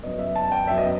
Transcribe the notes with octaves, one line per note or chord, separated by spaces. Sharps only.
F#2 F#3 B3 D#5
E5
A5
G5
F#2 F#3 B3 E5
D#5